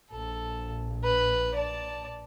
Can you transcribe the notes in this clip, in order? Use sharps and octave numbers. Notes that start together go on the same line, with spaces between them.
A#1 A4
B4
D5 A5